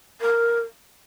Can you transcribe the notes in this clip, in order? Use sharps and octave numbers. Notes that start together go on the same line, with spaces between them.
A#4